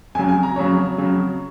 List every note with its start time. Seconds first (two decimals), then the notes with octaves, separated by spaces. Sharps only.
0.15 F2 C#3 F#3 G#5
0.29 G#5
0.43 A#5
0.56 F2 C#3 F#3 C#5
0.98 F2 C#3 F#3